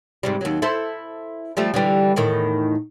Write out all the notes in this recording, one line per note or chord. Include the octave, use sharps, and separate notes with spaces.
G#2 C3 G3
D#2 F#3
E4 A4 C5
F3 G3 A3
D3 E3 G3
E2 A2 D#3